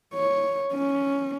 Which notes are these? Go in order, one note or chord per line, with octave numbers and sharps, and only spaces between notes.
C#5
C#4